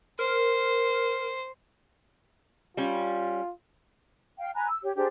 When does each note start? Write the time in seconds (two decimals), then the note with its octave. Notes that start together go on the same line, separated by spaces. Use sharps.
0.19 A#4 C5
2.77 G3 C#4 F4
4.39 F5 G5
4.55 G#5 A#5 B5 F#6
4.68 E6
4.83 G4 C#5
4.96 D4 G4 G#4 C5